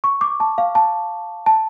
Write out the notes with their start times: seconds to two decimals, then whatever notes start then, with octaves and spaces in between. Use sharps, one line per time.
0.04 C#6
0.21 D6
0.40 A5
0.58 F5
0.75 A5
1.46 A5